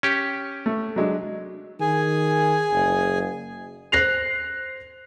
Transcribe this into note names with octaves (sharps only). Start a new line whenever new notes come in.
C#4 G4
A3
F#3 G#3 D4
D#3 G#4 G#5
F#1
C5 F#6 A#6 C7 F7